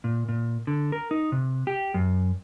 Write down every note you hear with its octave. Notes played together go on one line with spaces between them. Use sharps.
A#2
A#2
D3
A#4
D#4
C3
G4
F#2